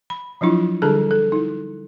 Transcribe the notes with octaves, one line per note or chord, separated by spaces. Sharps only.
B5
F3 F#3 D4 E4 F4
D3 G3 D4 G#4 A4 A5
A4
D#4 E4